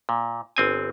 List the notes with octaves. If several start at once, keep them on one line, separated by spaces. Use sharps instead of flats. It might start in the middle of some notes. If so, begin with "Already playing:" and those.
A#2
G1 C4 G#5